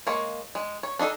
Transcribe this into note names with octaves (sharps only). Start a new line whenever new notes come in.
G#3 A#3 C#5
G#3
C#5
D4 D#4 G#4 A4